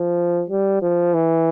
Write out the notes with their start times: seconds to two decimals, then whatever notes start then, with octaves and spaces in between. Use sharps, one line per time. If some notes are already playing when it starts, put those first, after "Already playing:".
Already playing: F3
0.50 G3
0.82 F3
1.14 E3